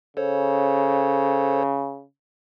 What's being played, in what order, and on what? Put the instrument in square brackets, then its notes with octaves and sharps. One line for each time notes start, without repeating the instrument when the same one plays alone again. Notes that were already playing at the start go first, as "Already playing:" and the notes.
[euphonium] C#3 [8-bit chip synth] A4 C5 C#5